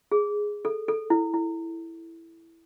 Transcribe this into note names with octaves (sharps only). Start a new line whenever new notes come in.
G#4
A4
A4
E4
E4